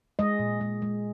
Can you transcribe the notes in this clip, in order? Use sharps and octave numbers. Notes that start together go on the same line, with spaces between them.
G#3 D#5
A#2
G#3
G#3